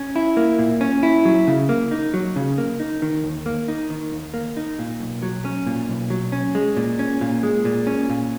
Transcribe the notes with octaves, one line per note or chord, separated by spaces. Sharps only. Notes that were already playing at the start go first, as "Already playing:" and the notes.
Already playing: C#4
E4
A#3
A#2
C#4
E4
F#3
C#3
A#3
D#4
F#3
C#3
A#3
D#4
D#3
D#2
A#3
D#4
D#3
D#2
A#3
D#4
A#2
B1
F#3
C#4
A#2
B1
F#3
C#4
G#3
A#2
C#4
A#2
G#3
A#2
C#4
A#2